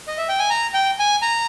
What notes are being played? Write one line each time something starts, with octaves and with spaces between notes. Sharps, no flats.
D#5
E5
G5
G#5
A#5
G5
G#5
A#5